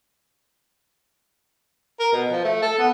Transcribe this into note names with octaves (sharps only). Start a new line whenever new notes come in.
A#4
B2
F3
A3
A4
B3